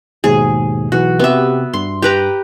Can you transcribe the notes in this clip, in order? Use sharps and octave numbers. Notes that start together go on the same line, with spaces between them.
D#2 G#2 B2 G#4
B1 E3 F#4
C3 B3 G4 E5
G2 C6
G4 B4 A#5